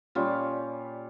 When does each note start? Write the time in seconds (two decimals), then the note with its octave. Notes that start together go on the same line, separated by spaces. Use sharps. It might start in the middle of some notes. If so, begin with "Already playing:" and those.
0.15 A#2 G3 C#4 F4